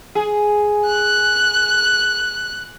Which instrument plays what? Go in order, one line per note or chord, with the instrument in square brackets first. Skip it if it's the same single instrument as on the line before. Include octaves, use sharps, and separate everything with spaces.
[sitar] G#4
[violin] F#6